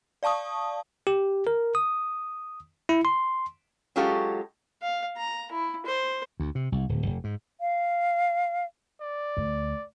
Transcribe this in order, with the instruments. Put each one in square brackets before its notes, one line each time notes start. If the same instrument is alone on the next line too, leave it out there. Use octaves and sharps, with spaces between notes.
[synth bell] D5 F5 A5 C#6 D#6
[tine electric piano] G4
A#4
D#6
E4
C6
[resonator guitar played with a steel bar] F#3 G#3 C#4 F4 G4 A4
[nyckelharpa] F5
A#5
E4
C5
[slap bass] D2
C3
C2
D1
F1
G#2
[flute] F5
[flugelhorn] D5
[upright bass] D2